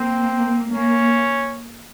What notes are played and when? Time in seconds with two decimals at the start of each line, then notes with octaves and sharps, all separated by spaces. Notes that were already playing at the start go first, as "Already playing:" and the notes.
Already playing: A#3 C4
0.70 A#3 C#4